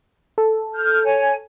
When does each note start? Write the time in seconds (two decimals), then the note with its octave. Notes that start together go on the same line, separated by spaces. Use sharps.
0.38 A4
0.74 F6 G6
1.04 C#5 G#5